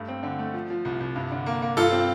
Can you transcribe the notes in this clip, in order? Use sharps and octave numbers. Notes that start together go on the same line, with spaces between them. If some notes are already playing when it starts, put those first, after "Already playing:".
Already playing: G2 A3
C4
D3
A3
F3
F3
C2
C2
G2
D3
A#3
A#3
G2 F4 A4
C4